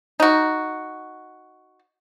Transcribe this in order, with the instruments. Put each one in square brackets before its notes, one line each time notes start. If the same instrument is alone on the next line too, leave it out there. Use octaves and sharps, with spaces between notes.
[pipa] D#4 F#4